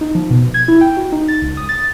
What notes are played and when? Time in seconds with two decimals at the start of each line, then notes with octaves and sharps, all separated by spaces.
0.01 D#4
0.15 F3
0.31 B2
0.54 G#6
0.68 E4
0.81 G5
0.97 F#4
1.12 D#4
1.28 A6
1.42 C#2
1.57 D#6
1.69 A6